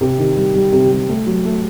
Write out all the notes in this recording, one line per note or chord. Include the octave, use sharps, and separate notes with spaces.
C3
D#3
G3
G3
C3
G3
A3
F#3
A3